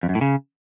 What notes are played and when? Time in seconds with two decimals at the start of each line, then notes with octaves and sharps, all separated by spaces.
0.03 F2
0.09 F#2
0.15 A2
0.21 C#3